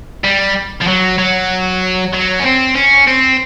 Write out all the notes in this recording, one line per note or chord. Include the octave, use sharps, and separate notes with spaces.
G3
F3
F#3
F#3
F#3
C#4
C4
C#4
C4